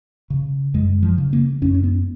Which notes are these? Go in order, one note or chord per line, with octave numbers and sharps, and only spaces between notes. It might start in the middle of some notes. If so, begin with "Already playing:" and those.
C#3
F#2 G#3
F3
C#3
A#3
F#2 C#4
C#4
B3